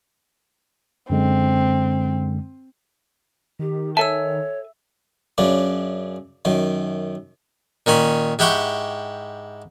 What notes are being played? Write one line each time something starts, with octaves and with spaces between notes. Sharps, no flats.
F#2 D3 G#3 C4
D#3 G4
A4 C#5 E5 G#5 A5 E6
F#2 C#3 D4
F#2 D#3
A#2 D#3 C#4 B5
G#2 E4 G4 F#5 G5 C#6